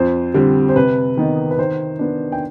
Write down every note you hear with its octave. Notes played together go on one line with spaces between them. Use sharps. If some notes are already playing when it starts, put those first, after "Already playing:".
Already playing: F2 C5
D3 G3 C4
C5
C3 B4
D#3 B3 D#4
B4
D#3 C5
B3 D4
G5